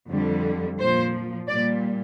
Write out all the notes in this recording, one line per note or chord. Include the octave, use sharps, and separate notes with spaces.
F2 D3 G3
A#2 F3 C5
A#2 G3 D5